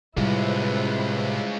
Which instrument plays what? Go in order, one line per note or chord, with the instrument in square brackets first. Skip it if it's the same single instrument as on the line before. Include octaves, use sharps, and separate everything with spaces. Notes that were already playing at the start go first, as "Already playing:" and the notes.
[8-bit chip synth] A2 C3 [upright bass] G3 [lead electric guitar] G#3 F4 [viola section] E4 B4 C5